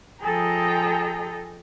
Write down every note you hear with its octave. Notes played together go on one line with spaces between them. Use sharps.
F3 G#4 A4 D#5 G5 A#5